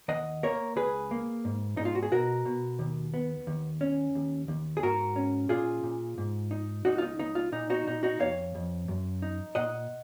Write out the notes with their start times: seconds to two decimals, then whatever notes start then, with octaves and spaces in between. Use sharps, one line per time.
0.08 D#2 D#5 F#5
0.43 A#3 A#4 C#5
0.76 C#2 G#4 B4
1.11 A#3
1.45 G#2
1.77 G#2 D#4
1.85 F4
1.95 F#4
2.03 G#4
2.12 B2 F#4 A#4
2.45 B2
2.79 D#2
3.14 B3
3.47 D#2
3.81 C#4
4.15 D#2
4.48 D#2
4.77 G#4
4.83 G#2 F#4 A#4
5.16 C#4
5.49 A#2 F4 G#4
5.83 A#2
6.18 G#2
6.51 D#4
6.85 C#2 D#4 F#4
6.98 F4
7.02 D#4
7.19 C#2 D#4
7.35 F4
7.52 A#2 D#4
7.70 D#4 F#4
7.87 A#2 D#4
8.03 D#4 F#4
8.20 F2 C#5 F5
8.55 F2
8.88 F#2
9.22 D#4
9.55 A#2 D#5 F#5